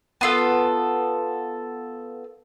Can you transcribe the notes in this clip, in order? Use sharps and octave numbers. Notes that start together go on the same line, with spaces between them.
B3 F4 A4